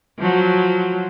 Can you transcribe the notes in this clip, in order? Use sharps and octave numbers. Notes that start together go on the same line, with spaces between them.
F3 F#3